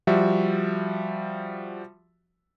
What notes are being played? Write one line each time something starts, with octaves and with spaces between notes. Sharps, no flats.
F3 G3 F#4 E5